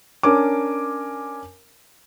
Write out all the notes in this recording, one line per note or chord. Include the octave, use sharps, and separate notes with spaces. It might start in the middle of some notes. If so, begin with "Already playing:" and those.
C#4 D4 A#4 G#5 D6